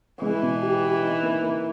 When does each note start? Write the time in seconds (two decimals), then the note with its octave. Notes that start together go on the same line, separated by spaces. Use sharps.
0.21 E3 G#3
0.42 B2
0.62 G4
0.83 G4
1.02 D#4
1.23 A#3
1.42 A#3